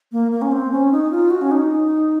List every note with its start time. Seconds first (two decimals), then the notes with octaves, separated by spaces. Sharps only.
0.12 A#3
0.32 A#3
0.42 C#4
0.51 C4
0.72 C#4
0.92 D#4
1.11 F4
1.30 F#4
1.41 C#4
1.51 D#4